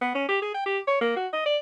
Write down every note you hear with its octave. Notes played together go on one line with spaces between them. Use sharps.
B3
C#4
G4
G#4
G5
G4
C#5
A#3
F#4
D#5
D5